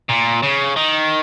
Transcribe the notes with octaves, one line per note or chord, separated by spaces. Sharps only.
A#2
C#3
D#3